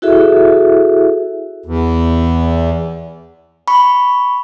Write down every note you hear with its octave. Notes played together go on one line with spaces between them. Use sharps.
E4 F#4 G#4 A4 E5
E2
B5 C#6